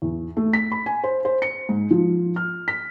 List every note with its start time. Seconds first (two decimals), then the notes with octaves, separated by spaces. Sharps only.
0.02 E2
0.37 A3
0.53 B6
0.72 B5
0.86 G#5
1.04 C5
1.25 C5
1.42 C#7
1.69 G#2
1.91 F3
2.36 F6
2.68 B6